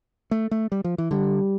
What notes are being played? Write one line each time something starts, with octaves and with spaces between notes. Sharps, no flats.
A3
A3
G3
F3
E3
D3 G3